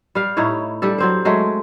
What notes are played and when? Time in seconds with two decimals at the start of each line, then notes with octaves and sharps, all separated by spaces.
0.15 G3 F5
0.37 A2 D#4 E4 C#5
0.82 G3 D4 A4
0.98 F#3 C4 C5
1.25 F#3 G#3 A3